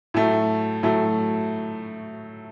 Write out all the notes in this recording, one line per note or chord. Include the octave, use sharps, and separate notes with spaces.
A2 F#3 A3
A2 F#3 A3